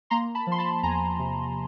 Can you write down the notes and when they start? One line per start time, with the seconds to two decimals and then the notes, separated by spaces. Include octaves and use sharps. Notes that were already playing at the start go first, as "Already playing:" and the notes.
0.10 A#3 A#5 C6
0.35 A5 B5
0.47 F3 C6
0.59 A5 B5
0.83 E2 G#5 A#5
1.19 C3